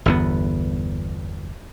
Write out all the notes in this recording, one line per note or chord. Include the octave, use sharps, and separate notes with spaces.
G1 E2 B3